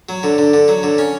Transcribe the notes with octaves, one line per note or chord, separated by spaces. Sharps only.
F#3
D3
D3
D3
F#3
D3
C#4